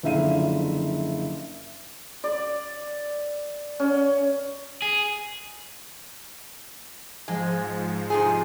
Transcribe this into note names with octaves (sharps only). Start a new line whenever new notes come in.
F#1 D3 F3 E5 F5 D#7
D5
C#4
G#4
G#2 F3 G#3
C3 D#4 G#4